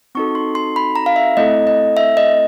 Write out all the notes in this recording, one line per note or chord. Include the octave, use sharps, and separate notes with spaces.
C4 D#4 F#4 A4 C#6
C6
C6
B5
A#5
F5
E5
A3 C4 E4 A4 D#5
D#5
E5
D#5